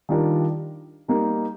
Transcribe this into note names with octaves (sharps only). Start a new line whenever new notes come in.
D#3 G3 D4 F4 A#4
G3 A#3 D#4 A#4